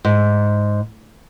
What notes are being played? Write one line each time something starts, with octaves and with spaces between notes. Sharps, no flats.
G#2